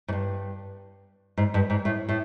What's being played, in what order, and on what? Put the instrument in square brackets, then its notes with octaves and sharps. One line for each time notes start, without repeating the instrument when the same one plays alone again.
[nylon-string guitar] G#2
G2
G#2
G2
G#2
A2
A2